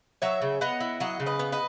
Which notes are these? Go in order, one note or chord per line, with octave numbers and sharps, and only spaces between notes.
F#3 C#5 E5
C#3
B3 D#5 F#5
E4
F#3 D#5 F#5
C#3
B4 D#5
B3
B4 D#5